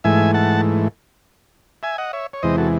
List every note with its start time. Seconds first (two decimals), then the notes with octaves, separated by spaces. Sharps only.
0.04 G#2 E3 A3 E5 G#5
0.34 F#5 A5
1.83 E5 G#5
1.98 D#5 F#5
2.13 C#5 E5
2.33 C#5
2.43 E2 C3 E3 G#3 C5 D#5
2.58 F#4 A4